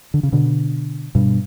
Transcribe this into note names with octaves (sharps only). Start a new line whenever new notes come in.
D3
C#3
B2 D3
G2 B2